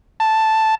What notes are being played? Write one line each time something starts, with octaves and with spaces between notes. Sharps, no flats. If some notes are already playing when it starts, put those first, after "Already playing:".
A5